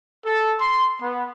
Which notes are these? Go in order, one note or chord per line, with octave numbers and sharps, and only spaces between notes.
A4
C6
B3